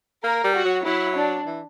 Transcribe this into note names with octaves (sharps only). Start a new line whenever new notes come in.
A#3 A#4
G3
F#4
F#3
F#3 E4
D4
E3